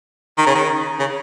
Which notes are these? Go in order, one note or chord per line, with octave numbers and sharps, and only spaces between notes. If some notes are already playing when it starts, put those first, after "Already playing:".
D#3
C#3
D#3
C#3